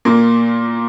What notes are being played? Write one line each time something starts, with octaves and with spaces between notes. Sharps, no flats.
A#2 A#3